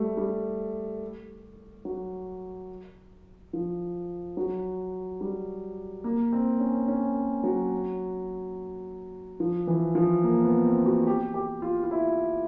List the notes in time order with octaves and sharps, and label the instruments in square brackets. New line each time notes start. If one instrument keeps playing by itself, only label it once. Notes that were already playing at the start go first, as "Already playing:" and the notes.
Already playing: [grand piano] G3 A3
G3
F#3
F3
F#3
G3
A#3
C4
C#4
C#4
F#3
F3
E3
F3
A#3
B3
C4
F#4
G4
G4
F4
F4
E4